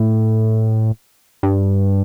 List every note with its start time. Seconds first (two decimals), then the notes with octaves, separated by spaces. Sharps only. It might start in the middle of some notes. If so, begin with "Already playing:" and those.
Already playing: A2
1.43 G2